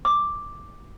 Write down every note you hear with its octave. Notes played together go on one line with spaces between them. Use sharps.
D6